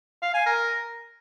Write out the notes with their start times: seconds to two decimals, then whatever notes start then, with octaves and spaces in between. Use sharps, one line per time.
0.22 F5
0.34 G#5
0.46 A#4